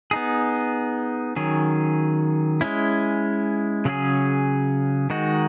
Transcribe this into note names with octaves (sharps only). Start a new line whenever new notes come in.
B3 D#4 G#4
D#3 F#3 C#4 G#4
G#3 C#4 E4
C#3 F#3 C#4 G#4
D#3 G#3 D#4 F#4